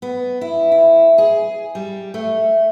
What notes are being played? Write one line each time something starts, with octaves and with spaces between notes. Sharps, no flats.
B3
E4
E4
G#4
G3
A3